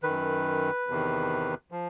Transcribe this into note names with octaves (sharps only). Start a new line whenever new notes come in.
F#2 D#3 B4
E2 C3 D#3
F3